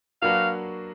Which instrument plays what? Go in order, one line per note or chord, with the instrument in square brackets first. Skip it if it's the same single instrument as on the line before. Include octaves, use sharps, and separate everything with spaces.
[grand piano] F#3 A#3 D4 F#4 B4 [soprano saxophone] F5